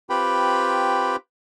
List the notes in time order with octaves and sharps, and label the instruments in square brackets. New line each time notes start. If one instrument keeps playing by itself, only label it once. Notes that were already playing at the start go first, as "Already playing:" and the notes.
[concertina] C4 F4 G4 B4 G5 B5